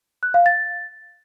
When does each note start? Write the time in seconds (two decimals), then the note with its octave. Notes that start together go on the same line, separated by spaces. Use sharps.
0.23 F#6
0.34 F5
0.46 A6